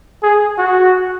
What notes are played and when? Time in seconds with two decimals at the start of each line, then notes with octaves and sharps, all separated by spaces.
0.23 G#4
0.58 F#4